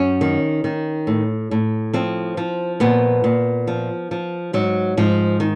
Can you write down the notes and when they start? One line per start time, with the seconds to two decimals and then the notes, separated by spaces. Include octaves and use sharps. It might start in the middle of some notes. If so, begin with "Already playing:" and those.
Already playing: F#2 C#4
0.21 D#3
0.64 D#3
1.07 A2
1.51 A2
1.94 F3 C4
2.37 F3
2.80 A#2 B3
3.24 A#2
3.67 F3
4.11 F3
4.53 G#2 F#3
4.97 G#2 F3
5.40 D#3